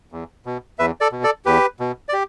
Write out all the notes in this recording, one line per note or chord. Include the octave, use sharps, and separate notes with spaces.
E2
B2
E2 B4 E5
A4 D5
B2
A4 D5
E2 G4 B4
B2
D5
G4